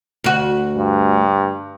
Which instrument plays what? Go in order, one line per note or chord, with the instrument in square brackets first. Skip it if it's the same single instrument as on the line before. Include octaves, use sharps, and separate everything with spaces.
[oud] D2 F#4
[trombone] G2